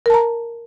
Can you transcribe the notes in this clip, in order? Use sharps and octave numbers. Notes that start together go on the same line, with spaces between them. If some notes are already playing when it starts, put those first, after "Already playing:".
A#4 A5 A#5